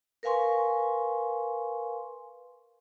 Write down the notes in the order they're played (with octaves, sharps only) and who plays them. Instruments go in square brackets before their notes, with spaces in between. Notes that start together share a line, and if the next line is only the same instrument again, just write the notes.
[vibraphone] A#4 B4 F5 G#5 C6 C#6